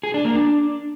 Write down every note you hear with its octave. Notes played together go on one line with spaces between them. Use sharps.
G#4
D4
A#3
D4